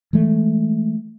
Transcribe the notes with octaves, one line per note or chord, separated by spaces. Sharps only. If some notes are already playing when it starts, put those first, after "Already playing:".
E3 G#3 A3